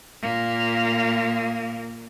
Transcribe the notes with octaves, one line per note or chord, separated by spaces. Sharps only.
A#2 A#3